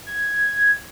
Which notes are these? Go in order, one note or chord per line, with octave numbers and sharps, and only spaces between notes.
G#6